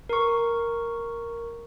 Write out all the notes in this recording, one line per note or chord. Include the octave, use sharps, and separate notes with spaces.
A#4 C#6